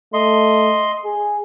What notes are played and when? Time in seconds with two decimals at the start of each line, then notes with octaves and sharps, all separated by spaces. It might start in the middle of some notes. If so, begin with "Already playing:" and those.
0.14 A3 D#5 C6
1.05 G#4